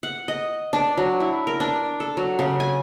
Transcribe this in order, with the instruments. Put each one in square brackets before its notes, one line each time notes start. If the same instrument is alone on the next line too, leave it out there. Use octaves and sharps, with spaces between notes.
[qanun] F#5
D#5
D4
F#3
E4
A#4
D4
A4
F#3
C#3
G#5